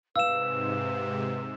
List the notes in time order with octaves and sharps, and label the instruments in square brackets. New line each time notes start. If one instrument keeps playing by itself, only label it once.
[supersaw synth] G#2 C3 [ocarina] B4 [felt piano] F5 [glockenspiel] E6 E7